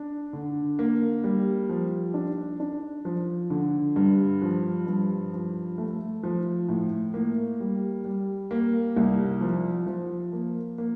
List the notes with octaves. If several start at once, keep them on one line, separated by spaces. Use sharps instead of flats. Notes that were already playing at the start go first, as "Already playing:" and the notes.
Already playing: D4
D3
A#3
G3
F3
D4
D4
F3
D3
G2
F3
G2
F3
A3
F3
A2
A#3
G3
G3
A#3
C2
F3
F3
A#3
A#3